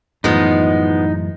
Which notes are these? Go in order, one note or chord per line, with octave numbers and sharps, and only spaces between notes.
F#2 A2 E3 F3 G#3 B3 D#4